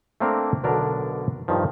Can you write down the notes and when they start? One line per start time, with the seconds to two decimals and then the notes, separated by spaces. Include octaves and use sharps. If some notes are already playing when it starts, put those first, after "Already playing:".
0.20 A3 A#3 C4 D4 A#4
0.64 B1 B2 D3 D4 A#4
1.48 G2 D#3 F3